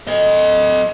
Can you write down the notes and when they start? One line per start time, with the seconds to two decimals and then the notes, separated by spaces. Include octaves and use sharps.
0.07 A4 D#5